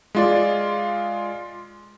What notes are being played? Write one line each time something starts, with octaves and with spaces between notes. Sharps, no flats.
G#3 F4 D5